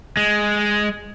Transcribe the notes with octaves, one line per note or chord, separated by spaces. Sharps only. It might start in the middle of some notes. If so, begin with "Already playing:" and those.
G#3